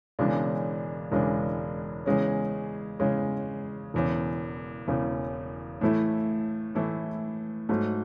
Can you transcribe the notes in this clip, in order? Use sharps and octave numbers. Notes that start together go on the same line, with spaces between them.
E1 E2 C#3 G#3 D4
E1 E2 C#3 G#3 D4
E2 C#3 G#3 C#4
E2 C#3 G#3 C#4
E1 E2 C#3
E1 E2 C#3
A2 E3 A3 E4
A2 E3 A3 E4
G#2 F#3 A3